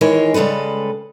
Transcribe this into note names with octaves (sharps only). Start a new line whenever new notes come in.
D#3 E3 G#3 A#4 C#5
C#3 G3 G#3 A4 B4